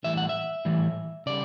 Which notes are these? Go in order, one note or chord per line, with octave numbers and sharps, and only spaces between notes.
A2 E3 G3 E5
F#5
E5
A2 E3 G3
C#3 G3 D5